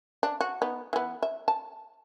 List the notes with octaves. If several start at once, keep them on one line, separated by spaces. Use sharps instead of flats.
D4
F#4
B3 D#4
E3 B3
E5
A5